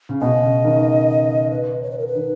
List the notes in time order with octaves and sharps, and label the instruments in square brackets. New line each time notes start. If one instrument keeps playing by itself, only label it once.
[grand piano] C#3
[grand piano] B2 [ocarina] D#5
[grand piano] C#3
D#3
[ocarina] B4
C#5
B4
A#4
B4
[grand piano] D#3